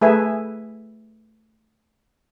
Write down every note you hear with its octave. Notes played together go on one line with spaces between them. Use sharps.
A3 G#4 B4 E5 G#5